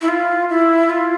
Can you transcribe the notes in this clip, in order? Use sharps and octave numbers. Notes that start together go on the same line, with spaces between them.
E4
F4
E4
F4